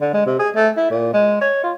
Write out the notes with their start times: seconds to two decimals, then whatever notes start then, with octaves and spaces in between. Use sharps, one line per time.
0.01 D3
0.13 G#3
0.26 C3
0.39 G#4
0.55 A3
0.77 E4
0.91 A#2
1.13 G#3
1.41 C#5
1.63 F4